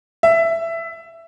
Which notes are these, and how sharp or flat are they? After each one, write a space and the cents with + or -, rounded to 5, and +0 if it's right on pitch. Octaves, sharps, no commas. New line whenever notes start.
E5 +10